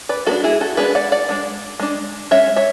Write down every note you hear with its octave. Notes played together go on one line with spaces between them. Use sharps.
B4 D5
G#3 B3 D4 F#4 A4
E4 G#4
F#4 A4
G#3 B3 D4 G#4 B4
D5 F#5
D5 F#5
G#3 D4
G#3 D4
G#3 C#4 C#5 E5
C#5 E5